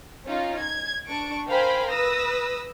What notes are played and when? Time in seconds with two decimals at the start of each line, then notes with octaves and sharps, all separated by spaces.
0.26 C#4 D#4 F4
0.62 G#6
1.09 D4 C#6 D7
1.48 A#4 C5 F5 G5 G#5 B5
1.92 B4 D#6 E6 A#6